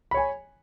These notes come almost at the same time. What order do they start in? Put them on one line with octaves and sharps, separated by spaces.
B5 C#5 G#5